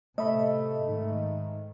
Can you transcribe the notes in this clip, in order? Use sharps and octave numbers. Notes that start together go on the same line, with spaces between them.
A2 C3 A3 D#5 E5 B5
G#2 D#3